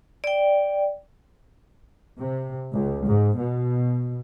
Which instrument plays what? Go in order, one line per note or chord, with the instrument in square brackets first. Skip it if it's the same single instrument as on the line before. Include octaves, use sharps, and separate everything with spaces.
[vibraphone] D5 G5
[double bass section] C3
C#2
G#2
B2